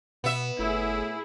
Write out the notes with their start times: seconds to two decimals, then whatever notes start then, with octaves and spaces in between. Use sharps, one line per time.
0.24 B2 B3 E5
0.59 G1 A2 E4 G#4